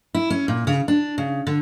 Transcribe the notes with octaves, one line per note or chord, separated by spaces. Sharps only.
E4
C#4
A#2
C#3
D4
C#3
D3